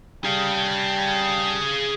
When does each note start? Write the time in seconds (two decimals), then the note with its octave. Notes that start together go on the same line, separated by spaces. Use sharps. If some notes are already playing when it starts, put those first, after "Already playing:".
0.25 G3 G#4 F5 G5 A5